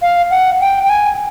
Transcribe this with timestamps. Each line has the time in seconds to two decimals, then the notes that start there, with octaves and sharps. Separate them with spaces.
0.02 F5
0.31 F#5
0.61 G5
0.84 G5
0.90 G#5